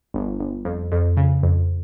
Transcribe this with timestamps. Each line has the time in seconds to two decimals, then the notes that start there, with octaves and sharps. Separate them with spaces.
0.14 G1
0.40 G1
0.65 F2
0.92 F2
1.17 C#3
1.43 F2